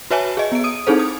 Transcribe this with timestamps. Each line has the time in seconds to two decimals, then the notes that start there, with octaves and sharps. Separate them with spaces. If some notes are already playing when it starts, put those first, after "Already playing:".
0.11 F#4 B4 C#5 E5 G#5 A5
0.37 G#4 D#5
0.52 B3 D7
0.64 D#6 D#7
0.87 C4 D#4 E4 G#4 A4 C5
0.99 D#6